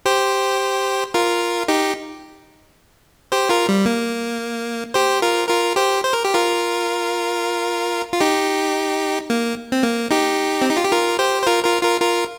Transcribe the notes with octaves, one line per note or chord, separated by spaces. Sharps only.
G4 C5
F4 A#4
D#4 G4
G4 C5
F4 A#4
G3
A#3
G4 C5
F4 A#4
F4 A#4
G4 C5
C5
A#4
G4
F4 A#4
F4
D#4 G4
A#3
C4
A#3
D#4 G4
C4
D#4
F4
G4
F4 A#4
G4 C5
C5
F4 A#4
F4 A#4
F4 A#4
F4 A#4